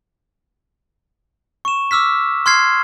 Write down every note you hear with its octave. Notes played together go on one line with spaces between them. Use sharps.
C#6 E7
D6 E6 F6 B6
C6 F6 G#6 C7